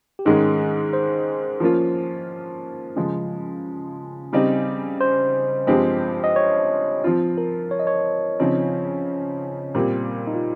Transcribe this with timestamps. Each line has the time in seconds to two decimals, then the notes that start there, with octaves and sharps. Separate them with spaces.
0.19 G4
0.26 G#2 D#3 G#3 C#4 G#4
0.59 G#4
0.93 C5
1.60 F3 A#3 C#4 F4
2.96 C#3 F3 G#3
4.33 C#3 G3 C4 D#4
5.01 C5
5.67 G2 F3 G#3 C4 G4
6.24 D#5
6.36 C#5
7.04 F3 C4 F4
7.38 A#4
7.71 C#5
7.79 D#5
7.87 C#5
8.40 C#3 F3 C4 D#4
9.75 A#2 G3 C4
10.27 D#4
10.35 F4